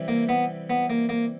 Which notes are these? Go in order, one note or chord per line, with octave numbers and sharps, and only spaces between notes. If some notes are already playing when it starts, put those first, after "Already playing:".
Already playing: C3 E3 G3
A#3
B3
B3
A#3
A#3